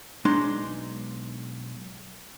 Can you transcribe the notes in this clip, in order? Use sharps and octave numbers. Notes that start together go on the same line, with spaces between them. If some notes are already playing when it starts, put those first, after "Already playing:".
B1 G#3 D4 D#4 C6